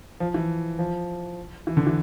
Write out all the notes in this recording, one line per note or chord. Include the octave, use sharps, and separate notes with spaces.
F3
E3
F3
E3
D3
E3